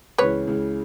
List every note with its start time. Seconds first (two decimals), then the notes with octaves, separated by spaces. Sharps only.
0.18 C#2 C#3 E3 B4 C#5
0.47 C#2 C#3 E3